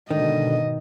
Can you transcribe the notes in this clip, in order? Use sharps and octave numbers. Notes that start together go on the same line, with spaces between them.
G#2 B2 D3 D#3 D#5